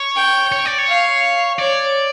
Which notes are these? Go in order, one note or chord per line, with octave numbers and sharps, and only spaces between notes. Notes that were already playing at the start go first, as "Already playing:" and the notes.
Already playing: C#5
G5
C#5
D5
C#5
F5
C#5 D5